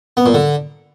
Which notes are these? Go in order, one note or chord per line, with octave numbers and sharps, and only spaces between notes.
B3
A#2
D3